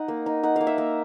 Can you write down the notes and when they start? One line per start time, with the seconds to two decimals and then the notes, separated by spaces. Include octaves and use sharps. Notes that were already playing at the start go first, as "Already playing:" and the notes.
Already playing: D#4 F#5
0.08 A#3
0.26 D#4
0.43 D#4 F#5
0.56 A#3 F5
0.67 E5
0.78 A#3